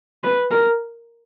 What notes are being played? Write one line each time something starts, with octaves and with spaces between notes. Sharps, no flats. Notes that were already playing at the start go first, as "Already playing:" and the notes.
B4
A#4